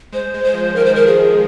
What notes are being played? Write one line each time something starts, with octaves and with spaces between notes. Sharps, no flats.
G#3 C5
G#3
C5
F3
D#3 A#4
C5
A#4
G#4